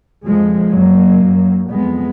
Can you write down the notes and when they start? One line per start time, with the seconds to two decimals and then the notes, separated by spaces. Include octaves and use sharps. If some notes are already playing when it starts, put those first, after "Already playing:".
0.25 F2 F3 G#3
0.74 F#2 F#3 A#3
1.22 F#2
1.72 F2 G#3 B3